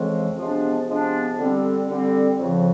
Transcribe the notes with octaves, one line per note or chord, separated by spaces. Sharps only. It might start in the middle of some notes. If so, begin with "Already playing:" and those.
Already playing: F2 C#3 E3 G#3 C4
C3 F3 G#3 B3 D4
C3 F3 G#3 B3 D4
D3 G3 C4
D3 G3 C4
F2 C#3 F3